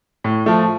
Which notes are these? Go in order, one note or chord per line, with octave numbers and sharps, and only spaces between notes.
A2
F3 A3